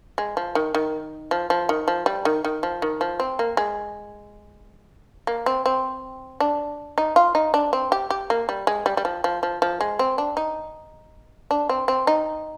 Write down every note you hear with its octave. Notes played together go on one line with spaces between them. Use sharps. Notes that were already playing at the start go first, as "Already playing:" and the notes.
G#3
F3
D#3
D#3
F3
F3
D#3
F3
G3
D#3
D#3
F3
D#3
F3
C4
A#3
G#3
A#3
C4
C4
D4
D#4
F4
D#4
D4
C4
G4
G4
A#3
G3
G#3
G3
G3
F3
F3
F3
F3
G#3
C4
D4
D#4
D4
C4
C4
D#4